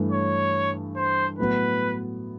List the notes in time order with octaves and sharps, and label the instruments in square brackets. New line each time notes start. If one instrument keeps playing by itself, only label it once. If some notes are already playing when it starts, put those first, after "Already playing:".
Already playing: [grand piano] G2 E3 A3
[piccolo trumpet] C#5
C5
[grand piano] A2 F#3 B3 [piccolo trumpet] B4